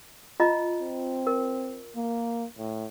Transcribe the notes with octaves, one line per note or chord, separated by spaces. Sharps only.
F4 D#5 A#5
C4
A#4
A#3
A2